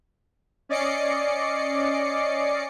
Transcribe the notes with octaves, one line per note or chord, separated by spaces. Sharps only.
C#4 D5 D#5 D6 C7 C#7